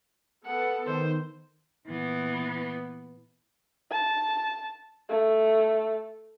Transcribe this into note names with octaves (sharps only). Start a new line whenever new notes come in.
B3 A4 F#5
D#3 C5
A#2 E3 B3
A5
A3